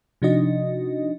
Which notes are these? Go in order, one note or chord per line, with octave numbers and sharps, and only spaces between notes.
C3 F3 D4 D#4 F#4 D#5